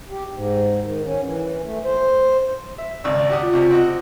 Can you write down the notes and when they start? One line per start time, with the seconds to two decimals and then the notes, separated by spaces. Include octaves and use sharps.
0.10 G4
0.32 G#2
0.83 D#3
1.04 C#4
1.22 E3
1.62 A3
1.84 C5
2.78 E5
3.04 G#1 C#2 D5 E6
3.29 F#4 G4 D#6
3.42 F4
3.53 C#2 C3
3.71 C4 F#4 D#5